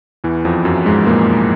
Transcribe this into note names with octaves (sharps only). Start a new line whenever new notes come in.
E2 E3
F2 F3
F#2 F#3
G#2 G#3
A#2 A#3